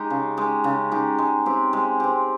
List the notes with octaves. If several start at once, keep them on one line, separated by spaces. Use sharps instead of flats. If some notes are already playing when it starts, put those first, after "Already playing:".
Already playing: G#3 D#4 G4
C#3
G#3 D#4 G4
C#3
G#3 D#4 G4
G#3
C4 G4
G#3
C4 G4